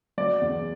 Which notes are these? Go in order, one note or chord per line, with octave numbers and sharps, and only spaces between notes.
F#3 D5
E2